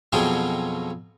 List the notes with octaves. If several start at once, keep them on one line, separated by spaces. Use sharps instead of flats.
F2 B2 F#3 F4 G#4 G5